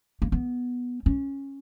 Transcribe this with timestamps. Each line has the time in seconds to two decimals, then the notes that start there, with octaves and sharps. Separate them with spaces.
0.22 A#3
0.32 B3
1.06 C#4